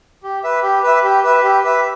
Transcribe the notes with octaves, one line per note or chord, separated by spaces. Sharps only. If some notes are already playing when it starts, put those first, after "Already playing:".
G4
B4 E5
G4
B4 E5
G4
B4 E5
G4
B4 E5